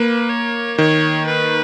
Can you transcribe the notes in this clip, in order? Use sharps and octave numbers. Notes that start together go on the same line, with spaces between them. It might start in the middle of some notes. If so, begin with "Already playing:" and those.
Already playing: A#3 B4
C#5
D#3 C#5
B4